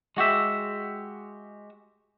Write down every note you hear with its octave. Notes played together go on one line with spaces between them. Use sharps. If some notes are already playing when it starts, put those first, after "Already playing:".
G#3 F#4 G4 E5